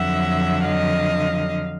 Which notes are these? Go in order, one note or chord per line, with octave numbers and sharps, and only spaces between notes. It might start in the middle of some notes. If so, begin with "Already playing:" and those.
Already playing: F2 D3 F#3 E5 F#5
D#5 F5